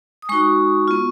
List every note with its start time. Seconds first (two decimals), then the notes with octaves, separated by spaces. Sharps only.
0.22 D#6
0.29 G#3 D#4 F#4 C#6
0.88 B3 F4